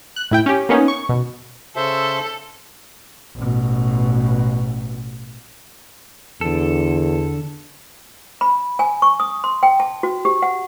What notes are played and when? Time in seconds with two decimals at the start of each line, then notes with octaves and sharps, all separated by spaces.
0.16 F#6
0.31 A2 E4 G5
0.46 C#4 G4
0.69 A#3 B3 C#4 D#4
0.88 C#6
1.09 B2
1.76 C#3 A4 C5 E5
3.36 A1 B2
6.41 E2 D3 A4
8.41 B5
8.79 G#5
9.02 C#6
9.20 D#6
9.44 C6
9.63 G5
9.80 A5
10.03 F#4
10.25 G4
10.42 F#5